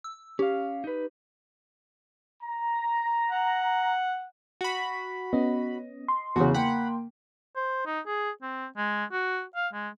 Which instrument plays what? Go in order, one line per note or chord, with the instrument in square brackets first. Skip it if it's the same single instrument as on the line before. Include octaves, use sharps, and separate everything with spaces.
[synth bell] E6
[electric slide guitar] C#4 F5 [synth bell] G4
[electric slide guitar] D#4 B4
[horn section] A#5
[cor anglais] F#5
[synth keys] F#4 B5
[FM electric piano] B3 C#4 [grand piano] D#5
[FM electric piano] C6
[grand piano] E2 C#3 [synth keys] F#4
[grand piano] A#3 G5 [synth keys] F#5 B5
[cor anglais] C5
D#4
G#4
C4
G#3
F#4
F5
G#3